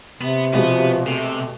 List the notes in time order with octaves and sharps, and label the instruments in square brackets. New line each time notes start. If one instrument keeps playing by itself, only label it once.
[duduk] C3 [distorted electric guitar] B3
[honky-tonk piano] B2 G#3 G4 [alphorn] F3 [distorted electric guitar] B3
[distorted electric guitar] C3 [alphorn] A3